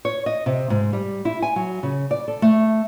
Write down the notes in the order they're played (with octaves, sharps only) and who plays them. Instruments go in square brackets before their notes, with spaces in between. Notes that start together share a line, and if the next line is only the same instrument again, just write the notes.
[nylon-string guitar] C#5
D#5
C3
G#2
G3
E4
G#5
F#3
C#3
D5
A4
A3